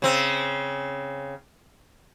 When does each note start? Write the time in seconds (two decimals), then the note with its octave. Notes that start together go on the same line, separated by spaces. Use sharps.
0.02 C#3 C4